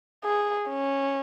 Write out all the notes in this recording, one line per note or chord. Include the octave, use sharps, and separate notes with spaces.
G#4
C#4